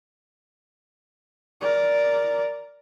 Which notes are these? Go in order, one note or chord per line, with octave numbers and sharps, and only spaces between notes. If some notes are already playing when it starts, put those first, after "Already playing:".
A#4 D5